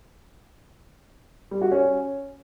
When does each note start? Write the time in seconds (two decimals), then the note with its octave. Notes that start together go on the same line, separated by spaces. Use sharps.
1.51 G3
1.61 F#4
1.72 C#4